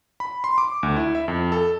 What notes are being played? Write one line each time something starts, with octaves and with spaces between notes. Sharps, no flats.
B5
C6
D6
D2
E4
E5
F2
A4